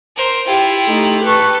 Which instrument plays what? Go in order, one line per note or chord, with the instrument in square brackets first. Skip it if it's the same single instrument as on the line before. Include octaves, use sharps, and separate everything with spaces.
[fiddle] A#4 C5
[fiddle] E4 F4 [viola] G4 [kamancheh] G5
[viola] A3 D#4 [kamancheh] G4
[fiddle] A4 [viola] B4 C#6